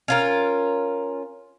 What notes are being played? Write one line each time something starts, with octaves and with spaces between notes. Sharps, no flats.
C#4 F4 A#4